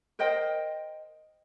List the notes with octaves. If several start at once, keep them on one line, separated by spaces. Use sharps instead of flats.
A#4 C5 D#5 G5